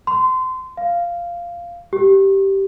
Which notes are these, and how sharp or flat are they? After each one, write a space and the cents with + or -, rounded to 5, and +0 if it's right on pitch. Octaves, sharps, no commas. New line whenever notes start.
C6 -25
F5 -10
G4 -10